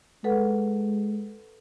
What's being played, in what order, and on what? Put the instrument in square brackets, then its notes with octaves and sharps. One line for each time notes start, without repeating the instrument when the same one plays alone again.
[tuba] G#3 [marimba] A4 B4 F#5